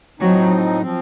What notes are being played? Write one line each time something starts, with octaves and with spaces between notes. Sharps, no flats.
A2 F3 F#3 C4 D#4
F3 C4